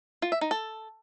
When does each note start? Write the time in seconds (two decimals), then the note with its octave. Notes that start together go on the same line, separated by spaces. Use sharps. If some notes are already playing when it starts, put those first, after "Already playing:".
0.22 F4
0.32 E5
0.41 D#4
0.51 A4